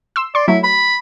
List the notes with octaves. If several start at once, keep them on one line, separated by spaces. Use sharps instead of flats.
C6 E6
D5 C6
F#3 A3 E4
B5